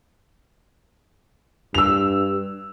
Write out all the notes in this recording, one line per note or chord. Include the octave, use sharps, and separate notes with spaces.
G2 E6 F7